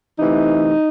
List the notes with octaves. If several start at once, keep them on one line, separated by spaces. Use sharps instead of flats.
C3 E3 A3 D#4